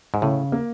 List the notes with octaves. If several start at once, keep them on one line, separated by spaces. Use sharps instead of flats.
G#2
A2 C#3
A#3